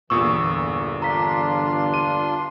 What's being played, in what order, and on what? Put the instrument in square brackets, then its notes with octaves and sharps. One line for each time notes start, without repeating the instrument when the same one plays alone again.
[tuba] G1 [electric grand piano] E2 A#2 E6 [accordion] E3 [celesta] C#6 D#6
[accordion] D4 F4 C6 [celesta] A#5 B6
[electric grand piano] D#7